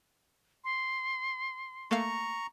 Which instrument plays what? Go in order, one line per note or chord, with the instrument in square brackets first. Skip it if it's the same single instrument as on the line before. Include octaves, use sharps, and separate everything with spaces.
[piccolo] C6
[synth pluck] A3 A#3 F5 [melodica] A#5 C#6